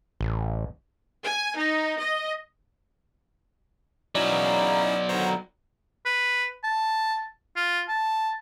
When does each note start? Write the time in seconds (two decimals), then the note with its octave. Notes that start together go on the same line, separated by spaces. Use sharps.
0.21 A1
1.23 G#5
1.56 D#4
1.98 D#5
4.15 F#3 B3 C#4 D#4 E4 D5
4.29 C#3 E3 A#3
5.09 A#2 D3 D#3 C5 C#5 A#5
6.06 B4
6.64 A5
7.56 F4
7.89 A5